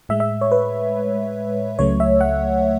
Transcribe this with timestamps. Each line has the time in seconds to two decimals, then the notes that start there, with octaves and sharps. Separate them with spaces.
0.09 A2 G#3 E5
0.20 E5
0.41 C#5
0.52 B4
1.79 C#2 C#3 F#3 A3 C#5
2.00 E5
2.21 F#5